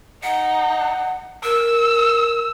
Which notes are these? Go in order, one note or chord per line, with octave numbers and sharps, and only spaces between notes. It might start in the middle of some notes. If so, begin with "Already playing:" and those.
D#4 F#5
A#4 E6